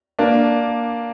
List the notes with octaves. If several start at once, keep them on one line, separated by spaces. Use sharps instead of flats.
A#3 D4